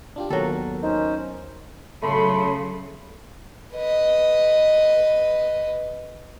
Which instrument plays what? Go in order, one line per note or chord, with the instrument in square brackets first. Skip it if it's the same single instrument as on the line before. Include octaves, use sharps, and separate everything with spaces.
[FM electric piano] D4 F4 G4
[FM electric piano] D#2 B3 A#4 [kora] F#3 A4
[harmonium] C#4 C5 [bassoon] D#4
[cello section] C#3 F#3 [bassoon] A3 [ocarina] A4 [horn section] B5 C6
[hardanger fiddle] B4 D#5